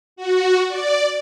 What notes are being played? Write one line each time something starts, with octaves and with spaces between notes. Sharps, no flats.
F#4
D5